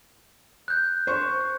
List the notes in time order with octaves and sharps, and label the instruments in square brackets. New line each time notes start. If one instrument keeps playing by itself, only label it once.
[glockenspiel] F#6 G6
[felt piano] C5 C#6